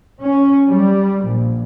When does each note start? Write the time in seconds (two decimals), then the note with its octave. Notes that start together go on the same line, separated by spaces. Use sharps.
0.21 C#4
0.68 G3
1.25 A#1